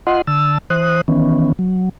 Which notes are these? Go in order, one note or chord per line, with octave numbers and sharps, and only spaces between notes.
F4 D#5 F#5 C6
D3 A5 E6
E3 C5 D#6 F#6
D#3 E3 B3 C#4
F#3